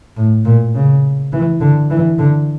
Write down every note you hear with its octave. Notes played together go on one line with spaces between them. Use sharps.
A2
A#2
C#3
E3
D3
E3
D3